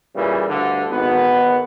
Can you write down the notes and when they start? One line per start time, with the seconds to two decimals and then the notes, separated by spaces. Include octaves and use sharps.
0.16 A#2 C#3 E3 G3
0.49 D2 G2 D3
0.91 G#1 B3